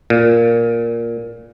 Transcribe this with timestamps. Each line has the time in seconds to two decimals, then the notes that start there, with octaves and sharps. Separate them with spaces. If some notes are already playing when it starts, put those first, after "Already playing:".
0.10 A#2